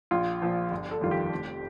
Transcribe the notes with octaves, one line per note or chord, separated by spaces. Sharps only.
A#1 F4
A#2 F3
G1
A4
F2 D#3 G3 F4
G4
F1